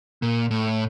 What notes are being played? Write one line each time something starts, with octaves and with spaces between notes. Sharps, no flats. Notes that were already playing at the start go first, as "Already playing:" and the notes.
A#2
A2